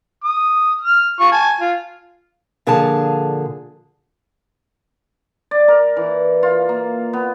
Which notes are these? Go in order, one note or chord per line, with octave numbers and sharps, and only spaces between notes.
D#6
F6
F4 C#6
G#5 A5
F4
A#2 D3 F3 G#4 A5
D5
A#4
E3
F4
A#3
B3